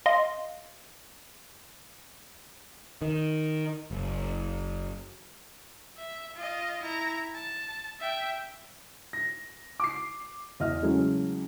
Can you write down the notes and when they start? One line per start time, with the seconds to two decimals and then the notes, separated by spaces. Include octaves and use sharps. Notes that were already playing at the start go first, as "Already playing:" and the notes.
0.06 D#5 F5 C6
3.02 D#3
3.91 F#1
5.97 E5
6.35 F4 D#5
6.82 E4 A#5
7.35 A5
8.00 E5 G5
9.13 A#6
9.80 D6 C7
10.60 E2 D#5 E5 F6
10.83 C#3 E3 F#3 G#3 A3